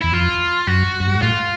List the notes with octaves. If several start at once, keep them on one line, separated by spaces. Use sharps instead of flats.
E2 E4
F2 F4
F#2 F#4
F#2
G2
G#2
A2 F4